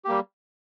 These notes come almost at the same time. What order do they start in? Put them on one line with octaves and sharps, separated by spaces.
G4 A#3 G3